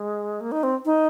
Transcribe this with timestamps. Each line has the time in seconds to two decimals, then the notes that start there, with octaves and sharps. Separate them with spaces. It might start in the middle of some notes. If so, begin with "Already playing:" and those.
Already playing: G#3
0.41 A#3
0.52 D#4
0.63 C4
0.85 D#4